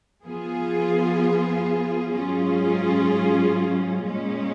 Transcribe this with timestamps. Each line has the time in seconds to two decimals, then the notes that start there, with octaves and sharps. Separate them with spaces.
0.24 F3 B3 F4 G#4
2.14 G#2 F#3 C#4 F4 G#4
4.04 A#2 G#3 C#4